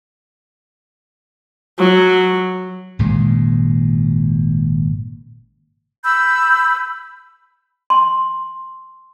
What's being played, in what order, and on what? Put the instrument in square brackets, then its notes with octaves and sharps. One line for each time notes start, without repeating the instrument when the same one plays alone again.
[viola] F#3
[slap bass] G#1 A#2 C#3 G#3
[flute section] B5 E6 G6
[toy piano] C6